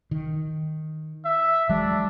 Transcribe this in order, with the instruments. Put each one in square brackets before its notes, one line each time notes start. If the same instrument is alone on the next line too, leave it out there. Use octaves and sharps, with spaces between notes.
[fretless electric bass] D#3
[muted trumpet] E5
[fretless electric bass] E3 F#3 G#3 [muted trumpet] D4